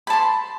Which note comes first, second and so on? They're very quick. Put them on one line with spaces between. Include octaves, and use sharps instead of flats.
B5 A5 C6